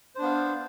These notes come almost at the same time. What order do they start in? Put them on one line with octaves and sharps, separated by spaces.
C5 D4 B3 F5